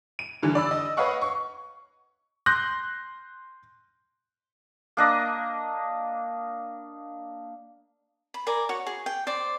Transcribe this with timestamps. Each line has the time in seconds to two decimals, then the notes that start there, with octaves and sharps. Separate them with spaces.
0.19 D#7
0.43 G2 D3 E3
0.55 D5 B5 E6
0.71 D#5
0.97 B4 C#5 D#5 F5 F#5 C#6
1.21 C#6
2.46 C6 F#6 G6 A#6
4.97 A#3 D4 D#5
8.34 B5
8.47 A#4 D5 G#5
8.69 F#4 C#5
8.87 G#4
9.06 G5
9.27 C5 D5